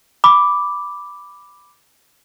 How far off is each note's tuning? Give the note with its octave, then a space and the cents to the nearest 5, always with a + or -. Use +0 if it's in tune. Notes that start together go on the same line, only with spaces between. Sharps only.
B5 +0 D6 +0